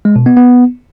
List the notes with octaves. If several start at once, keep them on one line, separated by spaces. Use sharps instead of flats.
G#3
B2
B3
B3